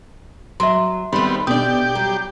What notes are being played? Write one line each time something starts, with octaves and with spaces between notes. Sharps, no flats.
F#3 E5 C6
D#3 G3 A3 B3 C4
B2 A3 D4 G4 D5 D#6
F#3 G3